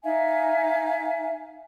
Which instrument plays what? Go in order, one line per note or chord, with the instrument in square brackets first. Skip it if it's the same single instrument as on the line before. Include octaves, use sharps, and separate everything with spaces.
[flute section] D#4 E5 F5 G#5